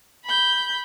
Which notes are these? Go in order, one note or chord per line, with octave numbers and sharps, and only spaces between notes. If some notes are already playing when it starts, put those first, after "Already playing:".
B5 G6